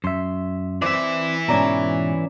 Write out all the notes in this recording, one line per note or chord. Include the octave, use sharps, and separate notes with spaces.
F#2 E5 C6
E3 C4 C5 D5 E5
G#2 B2 C#4 D5 A#5